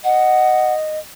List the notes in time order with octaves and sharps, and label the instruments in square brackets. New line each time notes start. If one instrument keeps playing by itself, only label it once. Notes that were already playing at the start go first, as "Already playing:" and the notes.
[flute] D#5 [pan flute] F#5